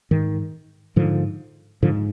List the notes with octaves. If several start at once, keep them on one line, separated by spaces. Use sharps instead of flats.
G#2 D#3
G#2 D3 F3
G#2 D3 F3